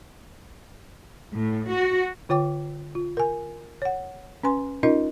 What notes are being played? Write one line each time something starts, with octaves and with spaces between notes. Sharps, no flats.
A2
F#4
D3 F4 C#5 G5 D6
F4
A#4 G#5
C#5 F#5
C#4 B4 G#5 C6
C#4 D#4 F4 A#4 D#5